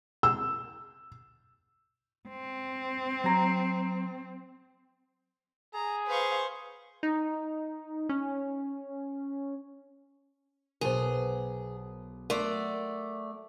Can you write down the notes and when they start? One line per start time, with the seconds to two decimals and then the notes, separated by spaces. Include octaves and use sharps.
0.23 E6
2.28 C4
3.24 F#3 A#5
5.74 G#4 A#5
6.07 B4 C5 F5 C#6
7.03 D#4
8.09 C#4
10.81 B1 B2 G#4 A#4 C5
12.30 A3 A#4 D5 F#5 C6